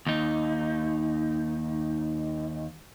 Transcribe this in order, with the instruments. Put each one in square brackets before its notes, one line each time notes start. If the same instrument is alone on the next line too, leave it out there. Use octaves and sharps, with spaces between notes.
[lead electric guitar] D#2 D#4